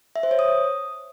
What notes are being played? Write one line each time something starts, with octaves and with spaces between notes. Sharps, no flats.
E5
C5
C#5
D#6